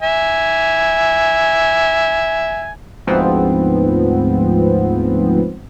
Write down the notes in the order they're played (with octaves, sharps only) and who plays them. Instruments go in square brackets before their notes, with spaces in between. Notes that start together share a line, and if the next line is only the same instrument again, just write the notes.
[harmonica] E5 G#5
[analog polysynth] D2 G#2 F3 B3 C4